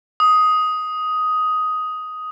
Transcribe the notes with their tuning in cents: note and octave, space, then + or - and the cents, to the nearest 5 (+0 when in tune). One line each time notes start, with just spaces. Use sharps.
D#6 +10